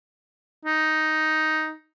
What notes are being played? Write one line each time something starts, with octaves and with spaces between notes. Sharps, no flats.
D#4